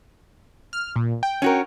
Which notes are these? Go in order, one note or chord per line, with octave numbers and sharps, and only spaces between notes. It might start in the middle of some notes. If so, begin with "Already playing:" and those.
F6
A#2
G5
C#4 F#4 A#4